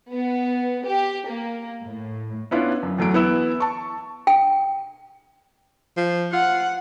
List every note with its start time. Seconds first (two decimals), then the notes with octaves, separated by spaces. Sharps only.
0.12 B3
0.86 G4
1.28 A#3
1.85 A2
2.51 B3 C#4 D4 E4 F4
2.83 F#2
2.98 E2 F#3 A3 D7
3.14 E3 B3 E4 E6 E7
3.60 A5 C#6
4.27 G5
5.97 F3
6.33 F4 F#5